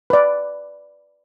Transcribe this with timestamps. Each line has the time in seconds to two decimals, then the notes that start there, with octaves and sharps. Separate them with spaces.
0.10 B4 D5